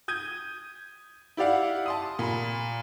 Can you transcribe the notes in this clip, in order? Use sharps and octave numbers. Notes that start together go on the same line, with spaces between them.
D#6 G6 G#6 D#7
E4 G4 D5 F5 F#5
A5 C6 D#6
A#2 B5